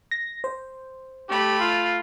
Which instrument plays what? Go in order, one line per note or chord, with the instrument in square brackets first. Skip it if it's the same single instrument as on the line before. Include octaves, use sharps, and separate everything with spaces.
[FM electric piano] A#6
C5
[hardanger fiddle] A3 B5 [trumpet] G4
[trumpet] F4